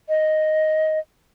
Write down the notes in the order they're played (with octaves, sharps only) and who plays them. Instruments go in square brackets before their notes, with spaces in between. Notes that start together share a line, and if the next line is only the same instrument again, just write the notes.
[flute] D#5